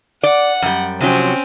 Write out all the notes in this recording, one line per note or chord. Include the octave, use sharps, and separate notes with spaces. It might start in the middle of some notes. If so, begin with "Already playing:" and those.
D5 F#5
F#2 G3
C3 F3 F#3 C4 C#4